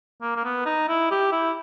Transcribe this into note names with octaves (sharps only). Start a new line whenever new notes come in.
A#3
A#3
B3
D#4
E4
G4
E4